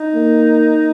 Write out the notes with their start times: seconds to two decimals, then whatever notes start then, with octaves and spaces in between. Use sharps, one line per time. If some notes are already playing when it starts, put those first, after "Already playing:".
Already playing: D#4
0.14 A#3